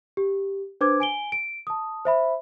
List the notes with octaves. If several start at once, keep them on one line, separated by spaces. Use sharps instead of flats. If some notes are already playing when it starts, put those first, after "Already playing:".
G4
D4 B4 C5 D6 G#6
G#5 D7 G7
D7
A5 D#6
C5 E5 B5